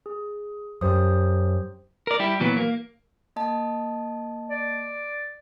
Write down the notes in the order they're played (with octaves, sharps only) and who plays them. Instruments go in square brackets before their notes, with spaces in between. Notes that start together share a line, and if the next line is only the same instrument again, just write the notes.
[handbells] G#4
[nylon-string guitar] F#2 [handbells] G4 C5 D#6
[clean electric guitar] A#4 D5
G3 E4 G4
A#2 E3 F#3 B3
A#3
[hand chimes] A#3 D#5 A5
[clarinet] D5